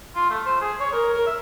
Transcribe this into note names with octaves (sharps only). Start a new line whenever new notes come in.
F4
A3
C5
G#4
C#5
A#4
A#4
E5